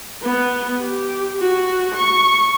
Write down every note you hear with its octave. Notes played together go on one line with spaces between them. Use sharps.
B3
G4
F#4
C#6